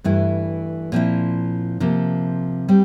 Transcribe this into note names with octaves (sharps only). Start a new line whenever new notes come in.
G2 E3 A3 E4
A#2 F3 C4 E4
C3 F3 A#3
G3 C4